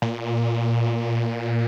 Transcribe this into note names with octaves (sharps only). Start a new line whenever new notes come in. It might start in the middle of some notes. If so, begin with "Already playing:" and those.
A#2